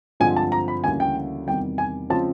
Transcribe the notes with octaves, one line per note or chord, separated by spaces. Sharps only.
G2 D3 F3 G#3 C4 G#5
A5
A#5
B5
D2 C#3 E3 G3 A#3 G#5
G5
E2 C3 D#3 G3 G5
G#5
C#3 F3 G#3 C4 A5